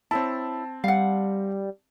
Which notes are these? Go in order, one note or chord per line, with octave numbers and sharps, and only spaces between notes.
C4 E4 C5 C#5 A5
G3 F5 F#5